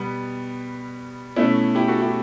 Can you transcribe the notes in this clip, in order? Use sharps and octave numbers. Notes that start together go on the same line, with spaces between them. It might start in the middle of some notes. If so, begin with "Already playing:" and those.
Already playing: B2 G3 B3
B2 A3 C#4 E4
E4 G4
F#4 A4
E4 G4